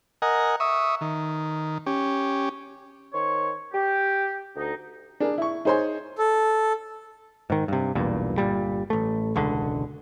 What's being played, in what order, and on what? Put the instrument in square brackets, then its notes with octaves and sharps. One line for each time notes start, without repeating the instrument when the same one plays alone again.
[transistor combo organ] A#4 D#5 F#5 G#5
E5 C#6 D#6
D#3
C#4 G4
[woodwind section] D#3 C5 C#5
G4
D2 D#4
[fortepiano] D4 G#4 A#4
E4 C#6
D#4 G#4 C5 C#5 C6
[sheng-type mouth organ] A4
[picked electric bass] G#2 D#3
G2 C3
B1 E2 G2 A#2
G1 D#2 A#2 G3
A1 A3
E1 C#2 D3